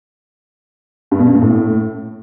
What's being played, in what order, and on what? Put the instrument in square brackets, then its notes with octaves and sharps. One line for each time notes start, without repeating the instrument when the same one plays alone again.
[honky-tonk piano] G2
B2
F#2
A#2
A2